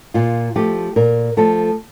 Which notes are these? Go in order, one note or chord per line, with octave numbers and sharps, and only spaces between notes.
A#2 F4
F3 A3 G4
A#2 A#4
F3 A3 A4